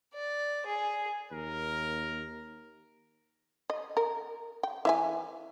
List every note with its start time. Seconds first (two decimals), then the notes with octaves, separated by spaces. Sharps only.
0.15 D5
0.67 G#4
1.32 D#2 A#4
3.70 D#5
3.97 A#4
4.63 G5
4.85 E3 E5 G#5